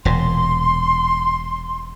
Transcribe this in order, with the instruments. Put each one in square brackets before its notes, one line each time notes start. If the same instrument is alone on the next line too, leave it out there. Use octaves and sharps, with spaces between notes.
[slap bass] E1 A#2 [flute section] C6